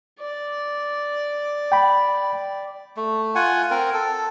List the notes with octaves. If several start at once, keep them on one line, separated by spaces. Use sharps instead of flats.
D5
G5 B5
A3
F4 F#5 G#5
C4 A#4
A4